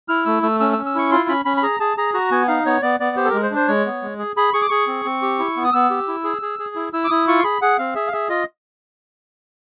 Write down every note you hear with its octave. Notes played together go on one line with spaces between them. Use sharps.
E4 F6
A3 E6
A3 E6
C#4 E6
E6
C#4
E6
E4 C#6
F4 C6
C#4 B5
C#4 B5
B5
G#4 A#5
G#4 A5
G#4 A#5
F#4 A#5
B3 G#5
D#4 F5
B3 C#5
B3 D5
B3 D5
G4 C5
A4
G#3 A#4
C5
D4
C5
G#3 C#5
B3
G#3
G#4
G#4 B5
G#4 C#6
D6
G#4 C#6
C4
C4
G4
E4
B3
D#6
B3 E6
G4
E4
G#4
G#4
G#4
E4
E4 E6
D6
E4 D#6
F4 C#6
C6
G#4 B5
G#4 F#5
C4 F5
G#4 E5
F5
G#4 E5
F4 D#5